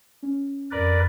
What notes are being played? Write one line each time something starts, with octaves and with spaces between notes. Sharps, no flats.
C#4
F2 A#4 B4 D5